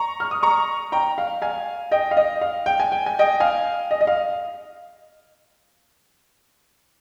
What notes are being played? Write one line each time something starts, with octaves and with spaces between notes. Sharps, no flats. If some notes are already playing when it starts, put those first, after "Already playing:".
Already playing: A#5 C#6
F6
D#6
A#5 C#6
G5 A#5
F5
F5 G#5
D#5 G5
F5
D#5
F5
G5
G#5
G5
G#5
D#5 G5
F5 G#5
D#5
D#5
F5